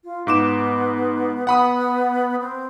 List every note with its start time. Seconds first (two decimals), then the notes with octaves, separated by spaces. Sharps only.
0.04 F4
0.27 G#2 B3 D6 E7
1.47 B3 F#5 B5 D#6
2.40 C4